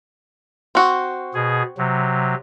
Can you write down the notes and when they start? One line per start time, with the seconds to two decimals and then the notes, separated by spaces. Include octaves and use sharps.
0.75 C4 F#4
1.34 B2 G#4
1.78 C3 F#3